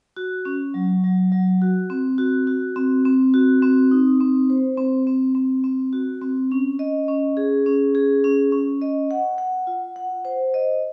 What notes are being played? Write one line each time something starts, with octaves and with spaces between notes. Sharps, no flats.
F#4
C#4
F#3
F#3
F#3
F#4
C4
F#4
F#4
C4
C4
F#4
C4
D#4
C4
C5
C4
C4
C4
C4
F#4
C4
C#4
D#5
C#4
G#4
C#4
G#4
C#4
C#4
D#5
F#5
F#5
F4
F#5
C5
D#5